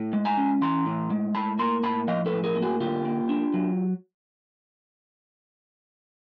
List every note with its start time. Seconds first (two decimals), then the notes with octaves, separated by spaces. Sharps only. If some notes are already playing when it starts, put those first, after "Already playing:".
Already playing: A2
0.13 G#3
0.25 G#5 A#5
0.37 C#4
0.62 E3 A#5 C6
0.86 A2
1.10 G#3
1.35 A2 A5 B5
1.59 A#3 A#5 C6
1.83 A2 A5 B5
2.08 F3 D#5 F5
2.26 A4 B4
2.32 A2
2.44 G#4 A#4
2.56 A#3
2.62 F#4 G#4
2.80 D3 F4 G4
3.05 A#3
3.29 D4
3.54 F#3